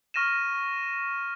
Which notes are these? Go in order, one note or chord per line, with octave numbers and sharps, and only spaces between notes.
C#6 F6 A#6 D#7 E7